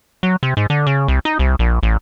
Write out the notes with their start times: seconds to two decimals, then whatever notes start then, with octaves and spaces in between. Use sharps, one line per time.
0.23 F#3
0.43 C3
0.57 G#2
0.70 D3
0.87 C#3
1.08 C2
1.25 D#4
1.39 C2
1.59 A#1
1.83 A1